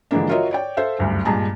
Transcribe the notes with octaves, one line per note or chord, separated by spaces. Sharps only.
D3 E3 F3 G#3 A#3 D4
F4 F#4 A#4 C#5 D#5 E5
C#5 D5 G5
A4 C5 E5 F5
F#1 D2 G2
G2 A#2 G#3 G#4 A5 A#5